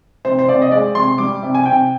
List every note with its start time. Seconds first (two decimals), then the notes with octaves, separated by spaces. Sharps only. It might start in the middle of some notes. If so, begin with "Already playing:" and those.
0.25 C3 C5
0.39 C5
0.48 C3 D5
0.62 D#5
0.72 G#3 D5
0.95 C3 C6
1.18 G3 D6
1.43 C3
1.55 G#5
1.66 C3 G5